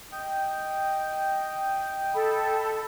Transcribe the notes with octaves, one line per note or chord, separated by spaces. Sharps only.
D#5 G5
A4 B5